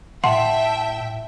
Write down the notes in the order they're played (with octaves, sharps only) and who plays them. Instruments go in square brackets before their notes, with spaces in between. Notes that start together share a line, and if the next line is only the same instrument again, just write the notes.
[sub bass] A2 [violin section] E5 G5 [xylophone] F#5 C6 [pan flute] A5